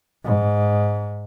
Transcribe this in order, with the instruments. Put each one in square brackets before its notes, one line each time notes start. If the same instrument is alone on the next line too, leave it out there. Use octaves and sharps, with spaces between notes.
[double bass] G#2